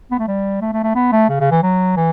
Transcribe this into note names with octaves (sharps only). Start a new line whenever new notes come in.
B3
A3
G3
A3
A3
A3
B3
A3
C#3
C#3
E3
F#3
E3